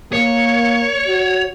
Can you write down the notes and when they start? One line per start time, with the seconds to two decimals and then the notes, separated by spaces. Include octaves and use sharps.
0.13 A#3 C#5
1.07 F#4